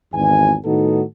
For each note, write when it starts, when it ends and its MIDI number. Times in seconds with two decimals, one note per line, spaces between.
0.13 0.54 32
0.13 0.54 40
0.13 0.54 80
0.65 1.02 45
0.65 1.02 51
0.65 1.02 59
0.65 1.02 63
0.65 1.02 66
0.65 1.02 69